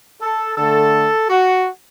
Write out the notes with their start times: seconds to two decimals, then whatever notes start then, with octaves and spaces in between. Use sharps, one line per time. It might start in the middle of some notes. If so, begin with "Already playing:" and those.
0.21 A4
0.57 D3 A3 A4
1.30 F#4